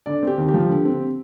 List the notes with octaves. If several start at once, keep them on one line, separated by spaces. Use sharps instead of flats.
D3 D5
C4 G4
D#2
G4
F3
D3
C4